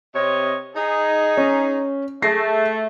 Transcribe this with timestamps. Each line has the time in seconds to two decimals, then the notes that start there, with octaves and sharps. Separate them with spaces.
0.15 C3 C#5 D#5
0.75 D#4 G#4
1.37 C#4
2.22 A3 G#4 A#6 C7